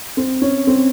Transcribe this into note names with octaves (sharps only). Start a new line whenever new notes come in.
C4
C#4
C4